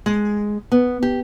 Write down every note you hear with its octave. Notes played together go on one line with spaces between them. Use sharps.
G#3
B3
G4